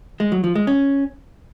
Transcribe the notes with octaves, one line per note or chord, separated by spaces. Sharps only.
G#3
F#3
F3
G#3
C#4